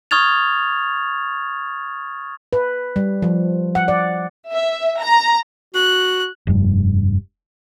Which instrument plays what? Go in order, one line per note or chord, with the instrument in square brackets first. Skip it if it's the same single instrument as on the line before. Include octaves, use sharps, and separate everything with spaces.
[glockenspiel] C#6 D#6 F6 G#6 A6 F7
[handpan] B4
G3
F3
F#5
D5
[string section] E5
A#5
[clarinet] F#4 [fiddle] F#6
[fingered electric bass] F1 G2